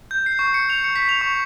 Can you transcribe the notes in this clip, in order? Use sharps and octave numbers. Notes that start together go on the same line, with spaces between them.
G6
C7
C#6
C#7
F7
C#7
B6
F7
C#6